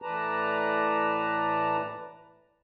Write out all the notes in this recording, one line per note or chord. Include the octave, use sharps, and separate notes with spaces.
A2 E3 B4 D5 A5 A#5